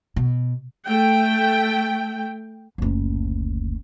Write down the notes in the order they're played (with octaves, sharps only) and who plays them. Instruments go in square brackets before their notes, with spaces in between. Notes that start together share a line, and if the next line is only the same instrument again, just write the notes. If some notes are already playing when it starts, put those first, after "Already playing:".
[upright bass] B2
[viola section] A3 G5
[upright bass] F#1 D2